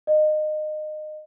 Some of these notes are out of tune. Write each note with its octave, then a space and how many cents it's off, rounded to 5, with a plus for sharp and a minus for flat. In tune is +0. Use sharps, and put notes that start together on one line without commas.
D#5 -25